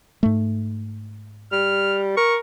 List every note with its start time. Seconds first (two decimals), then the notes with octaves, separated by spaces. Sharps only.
0.23 G#2 A3
1.52 G3 F6
2.17 A#4 C#6